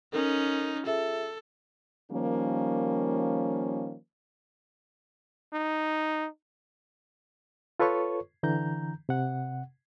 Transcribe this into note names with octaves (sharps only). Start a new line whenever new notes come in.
C#4 D#4 A4 A#4
F4 G#4 A4 E5
D#3 F3 G3 A#3 C#4
D#4
F4 A4 B4 C#5 C#6
D3 E3 A#5 G6
C3 F#5